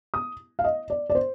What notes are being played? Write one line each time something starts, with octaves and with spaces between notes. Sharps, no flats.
D#6
F5
D#5
D5
D5
C5